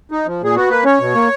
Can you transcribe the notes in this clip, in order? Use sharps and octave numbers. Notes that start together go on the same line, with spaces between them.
D#4
F3
A#2 G#4
B3 F#4
A#3 B4
C#4 C#5
B2
A#3